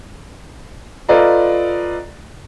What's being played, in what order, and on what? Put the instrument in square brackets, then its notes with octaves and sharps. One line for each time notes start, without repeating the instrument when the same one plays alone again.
[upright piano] F4 A4 B4 D5 D#5 A#5